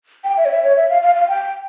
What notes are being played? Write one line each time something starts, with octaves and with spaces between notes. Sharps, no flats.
G5
E5
C#5
E5
C#5
E5
F5
F5
F5
G5